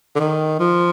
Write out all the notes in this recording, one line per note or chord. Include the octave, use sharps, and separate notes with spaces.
D3
D#3
F3